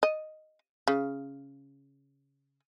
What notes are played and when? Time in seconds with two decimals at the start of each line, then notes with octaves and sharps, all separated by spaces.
0.03 D#5
0.88 C#3